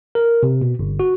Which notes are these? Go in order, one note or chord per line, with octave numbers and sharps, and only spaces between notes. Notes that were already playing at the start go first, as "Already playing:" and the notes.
A#4
C3
B2
G1
F#4